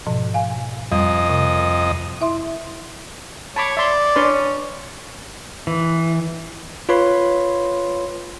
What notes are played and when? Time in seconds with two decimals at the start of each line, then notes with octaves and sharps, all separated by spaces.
0.07 G#2 B2 F3
0.34 F5 G#5
0.92 F2 G3 D#5
1.29 C3
2.21 E4 E5 C6
3.56 C#5 A5 B5 D6
3.77 D5 E5 C6
4.16 C#4 D4 B4 C6
5.67 E3
6.89 F4 B4 C#5 B5 C6